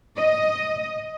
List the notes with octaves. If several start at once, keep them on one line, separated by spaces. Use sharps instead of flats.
D#5